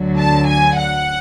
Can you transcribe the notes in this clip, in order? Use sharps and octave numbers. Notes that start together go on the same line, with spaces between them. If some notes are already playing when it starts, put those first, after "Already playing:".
Already playing: D2 D3 F#3
A5
G#5
F#5